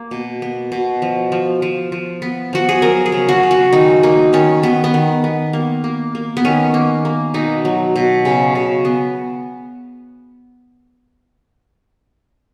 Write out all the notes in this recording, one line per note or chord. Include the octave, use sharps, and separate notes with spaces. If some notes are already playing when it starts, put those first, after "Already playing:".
Already playing: A#3
B2
B3
B2
F3
F3
F3
F3
B3
F3 F#4
G#4
F#3 A#4
G#4
C#3
F#4
C#3
F#4
D#3 D#4
A#3 D#4
D#3 C#4
D#3 B3
B3
D#3
B3
A#3
A#3
A#3
B3
D#3 C#4
A#3
A#3
B2 D#4
F#3
B2
C#3
C#3
B3